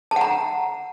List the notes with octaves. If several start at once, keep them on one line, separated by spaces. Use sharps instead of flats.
F#5 A5 A#5